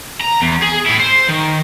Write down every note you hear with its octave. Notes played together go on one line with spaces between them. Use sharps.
A#5
E2
G#4
A2 E4
C5
D#3